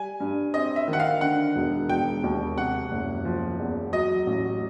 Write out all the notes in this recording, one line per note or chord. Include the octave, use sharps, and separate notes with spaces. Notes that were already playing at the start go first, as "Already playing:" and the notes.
Already playing: G3 G#5
G2
C4 D#5
E5
D#3
F#5
F5
D3 F#5
E1
E1 G5
D#2
C3 F#5
F#1
F3
E2
F#3 D#5
A1